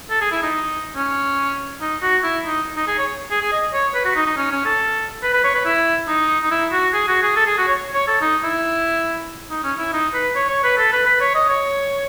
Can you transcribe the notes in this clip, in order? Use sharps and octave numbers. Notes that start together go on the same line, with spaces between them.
A4
G#4
E4
D#4
C#4
D#4
F#4
E4
D#4
D#4
G#4
C#5
G#4
G#4
D#5
C#5
B4
F#4
D#4
D#4
C#4
C#4
A4
B4
B4
C#5
B4
E4
D#4
D#4
E4
F#4
G#4
F#4
G#4
A4
G#4
F#4
C#5
C#5
A4
D#4
E4
D#4
C#4
E4
D#4
B4
C#5
C#5
B4
A4
B4
B4
C#5
D#5
C#5